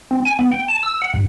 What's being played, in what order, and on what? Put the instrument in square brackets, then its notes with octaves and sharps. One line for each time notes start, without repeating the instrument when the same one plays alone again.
[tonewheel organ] C4
G#5
B3
G5
A5
E6
F#5
G2